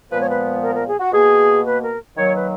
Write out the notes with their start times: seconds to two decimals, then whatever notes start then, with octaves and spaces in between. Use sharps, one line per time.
0.09 A#2 F3 G#3 B3 B4
0.20 C#5
0.29 B4
0.61 A#4
0.74 A#4
0.87 G#4
1.00 F#4
1.13 B2 A#3 G#4
1.65 B4
1.82 A#4
2.16 D#3 F#3 A#3 C#5
2.34 B4